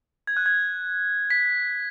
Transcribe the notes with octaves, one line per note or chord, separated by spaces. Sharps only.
G#6
F#6
G#6
B6